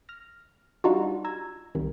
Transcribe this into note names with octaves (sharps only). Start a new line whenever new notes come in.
F6 A#6
G3 D4 D#4 F4 F#4
A#5 E6 G#6
C2 C3 D#3